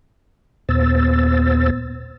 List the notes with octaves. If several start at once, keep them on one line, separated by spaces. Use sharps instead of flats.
D#2 A#2 B3 C5 E6 A6